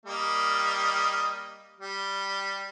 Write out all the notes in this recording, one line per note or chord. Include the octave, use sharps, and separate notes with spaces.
G3 A#3 D#5
G3